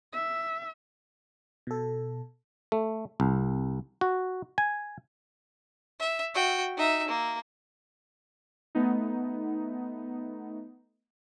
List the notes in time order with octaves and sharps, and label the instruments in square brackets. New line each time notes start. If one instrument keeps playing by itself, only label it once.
[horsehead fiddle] E5
[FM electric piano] B2 A4
[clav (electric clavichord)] A3
C2
F#4
G#5
[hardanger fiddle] E5
F#4 G5
D#4 E5
A#3
[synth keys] A3 B3 D#4